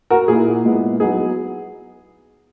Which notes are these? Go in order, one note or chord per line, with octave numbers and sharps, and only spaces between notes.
F#4 A#4
A#2 A#3 E4 G#4
A#2 G#3 B3 E4
F#3 B3 D#4 G#4